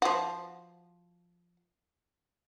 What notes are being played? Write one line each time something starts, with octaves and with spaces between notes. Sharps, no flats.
F3 F#4